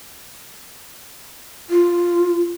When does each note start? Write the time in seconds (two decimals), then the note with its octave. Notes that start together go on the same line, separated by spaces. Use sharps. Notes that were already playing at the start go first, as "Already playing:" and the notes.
1.70 F4